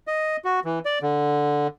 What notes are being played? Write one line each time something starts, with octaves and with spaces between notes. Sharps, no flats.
D#5
F#4
E3
D5
D3